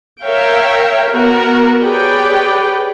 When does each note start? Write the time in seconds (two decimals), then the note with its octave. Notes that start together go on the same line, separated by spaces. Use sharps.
0.23 A#4 C#5 E5 F5 G5
1.11 B3 F#4 A#4
1.81 G4 G#4 B4 C#5 D5 G5